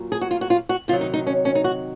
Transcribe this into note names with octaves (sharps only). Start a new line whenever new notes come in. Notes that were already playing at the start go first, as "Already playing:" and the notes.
Already playing: A#2 F#3
G#4
F#4
F4
F#4
F4
F#4
C3 D#3 F#3 F4
D#4
D#4
C#4
C#4
D#4
F#4